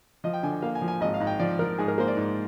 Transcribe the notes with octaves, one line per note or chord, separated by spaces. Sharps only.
F3 D#5
G5
D3 G#5
G#5
A#3 F5
G#5
F3
G#5
G#1 D#5
F5
G#2
G5
F3 D5
F3 A#4
G#2 G#4
A#4
A#3 C5
D5
G#2